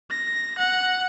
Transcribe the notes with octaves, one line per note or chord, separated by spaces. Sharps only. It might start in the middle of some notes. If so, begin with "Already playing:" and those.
A#6
F#5